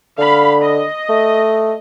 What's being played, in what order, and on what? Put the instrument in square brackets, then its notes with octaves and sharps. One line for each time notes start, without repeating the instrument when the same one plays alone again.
[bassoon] D3 [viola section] F5 B5
[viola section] D#5
[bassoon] A3